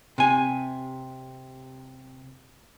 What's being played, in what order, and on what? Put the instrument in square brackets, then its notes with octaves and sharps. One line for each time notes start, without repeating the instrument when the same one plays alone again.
[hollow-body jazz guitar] C3 G#5